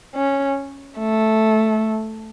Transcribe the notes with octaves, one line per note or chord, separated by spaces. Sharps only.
C#4
A3